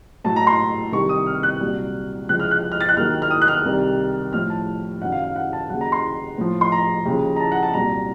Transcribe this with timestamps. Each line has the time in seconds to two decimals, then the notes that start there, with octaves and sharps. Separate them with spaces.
0.24 A2 F#3 A5
0.36 A#5
0.47 C6
0.92 C2 C3 D#3 C#6
1.09 D#6
1.26 F6
1.43 F#6
1.61 C2 A#2 F#3
2.29 C#2 C#3 F3 F#6
2.40 F6
2.51 F#6
2.72 F6
2.81 A6
2.89 F#6
2.97 D#2 D#3 F#3 F6
3.22 F6
3.30 D#6
3.42 F#6
3.48 F6
3.66 C2 C3 D#3
4.33 A2 F3 F6
4.50 A5
5.02 F#2 D#3 F#3 F#5
5.12 F5
5.24 F5
5.36 F#5
5.53 A5
5.70 D#2 C#3 F#3 F#5
5.81 A#5
5.92 C6
6.38 A2 F3
6.61 C6
6.72 A#5
7.05 D#2 C#3 F3
7.36 A#5
7.40 A5
7.52 F#5
7.63 A5
7.74 C2 A#2 F#3 A#5